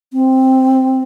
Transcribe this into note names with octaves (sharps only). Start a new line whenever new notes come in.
C4